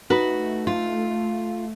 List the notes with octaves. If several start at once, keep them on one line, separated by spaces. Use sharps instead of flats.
A3 D#4 F#4 B4
F4